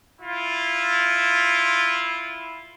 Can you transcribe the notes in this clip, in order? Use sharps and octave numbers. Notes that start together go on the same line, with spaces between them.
E4 F4